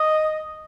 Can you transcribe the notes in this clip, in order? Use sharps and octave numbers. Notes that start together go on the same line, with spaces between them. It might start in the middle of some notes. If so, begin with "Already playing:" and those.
Already playing: D#5